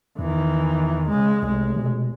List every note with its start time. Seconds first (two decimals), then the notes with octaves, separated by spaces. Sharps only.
0.19 E2 D#3 E3
1.08 C#3 G#3
1.43 F1 C2 G#3
1.76 B2